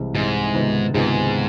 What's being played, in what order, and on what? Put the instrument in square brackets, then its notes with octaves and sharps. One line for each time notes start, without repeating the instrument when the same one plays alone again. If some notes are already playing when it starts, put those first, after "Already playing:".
Already playing: [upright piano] C2 C3 E3 G#3
[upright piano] C2 C3 E3 G#3 [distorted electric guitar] G#2
[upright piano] C#2 C3 D#3 G#3 B3
[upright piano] C#2 C3 D#3 G#3 B3 [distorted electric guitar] G#2